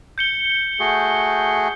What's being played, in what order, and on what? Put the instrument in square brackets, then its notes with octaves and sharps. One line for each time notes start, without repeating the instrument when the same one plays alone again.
[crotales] G6 C#7 G7
[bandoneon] A3 F#4 G#4